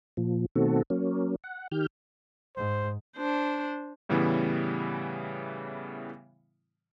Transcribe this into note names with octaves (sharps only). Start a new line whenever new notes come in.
A#2 F3
B2 D#3 A3 C4 F#4 A4
F#3 A#3 C#4
F#5
D#3 G4 F6 G6
G#2 C5
D4 C5
A2 C#3 E3 G3 B3 E4